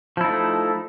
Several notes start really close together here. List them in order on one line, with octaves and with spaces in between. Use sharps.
F3 E4 D#4 A3